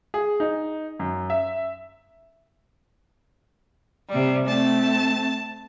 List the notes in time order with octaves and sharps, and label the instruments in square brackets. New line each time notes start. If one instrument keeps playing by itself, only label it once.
[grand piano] G#4
D#4
F#2
E5
[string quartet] C3 G3
[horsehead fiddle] A3 C4 [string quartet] A5